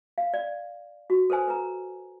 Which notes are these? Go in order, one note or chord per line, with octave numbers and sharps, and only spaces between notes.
F5
D5
F#4
A4 B4 C5 G#5
B4 A#5